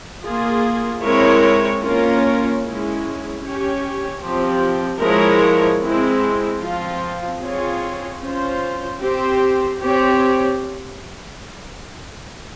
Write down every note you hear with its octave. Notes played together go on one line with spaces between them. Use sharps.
A#3 F4 G#4
G#3 C4 E4 A#4 C#5
A#3 C#4 F4 A#4 C#5
G#3 C#4 E4
C#4 G4 C#5
F3 C4 G4
F3 G#3 E4 A#4 C#5
G#3 C4 E4
F3 C4 F4
C4 F4 G#4 C#5
C#4 F4 C5
C4 G4 C5
C4 G4 C#5